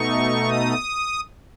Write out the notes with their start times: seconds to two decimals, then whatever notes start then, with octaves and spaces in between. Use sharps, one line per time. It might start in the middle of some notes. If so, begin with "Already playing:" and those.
Already playing: B2 A3 D#4 C#6
0.46 D#6